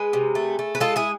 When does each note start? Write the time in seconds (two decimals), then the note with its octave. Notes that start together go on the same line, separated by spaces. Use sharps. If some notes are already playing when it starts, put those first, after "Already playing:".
Already playing: G#3 G#4 B4
0.13 C3
0.35 A3
0.59 A3
0.75 B4
0.80 G#3 F4 A4
0.96 E4 G#4